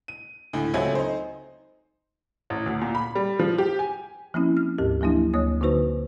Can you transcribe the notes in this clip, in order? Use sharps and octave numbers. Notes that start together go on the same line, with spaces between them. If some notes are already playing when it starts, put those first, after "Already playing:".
D#7
D2 A2
C#2 F#3 A3 C4 E5 G#5
D#4 C5
A1
D2
A#2
B5
G3
F3
G4
G#5
F3 A#3 C4 C#4 E4
F6
D2 G#2 G4 A#4
F3 F#3 A#3 D4 E4
D2 A#3 C#5 D#6
D3 A#3 D#4 F#4 B4 C5